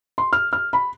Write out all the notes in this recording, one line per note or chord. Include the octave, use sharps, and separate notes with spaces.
C6
F6
F6
B5